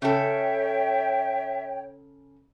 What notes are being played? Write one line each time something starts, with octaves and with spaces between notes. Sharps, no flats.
C#3 A4 C#5 E5 G5